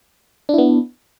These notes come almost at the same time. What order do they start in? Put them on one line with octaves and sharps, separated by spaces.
D4 E4 B3